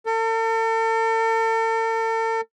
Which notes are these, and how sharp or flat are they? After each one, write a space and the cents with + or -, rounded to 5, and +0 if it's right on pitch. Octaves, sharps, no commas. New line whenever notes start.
A4 +40